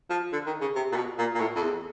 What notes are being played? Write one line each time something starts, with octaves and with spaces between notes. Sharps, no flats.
F3
D3
D#3
C#3
C3
A#2
B2
A#2
A#2
A2
F2
E2